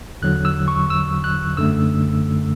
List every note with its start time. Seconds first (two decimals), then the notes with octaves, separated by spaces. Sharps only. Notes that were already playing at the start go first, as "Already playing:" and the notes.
0.22 E2 D3 F#3 F#6
0.45 E6
0.68 C#6
0.90 E6
1.24 F#6
1.57 F#2 D3 A3 E6